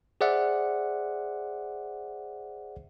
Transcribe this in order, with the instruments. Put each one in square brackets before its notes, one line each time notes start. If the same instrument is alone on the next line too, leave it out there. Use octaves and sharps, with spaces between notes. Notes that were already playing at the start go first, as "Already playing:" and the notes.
[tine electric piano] G#4 C5 D5 E5 F#5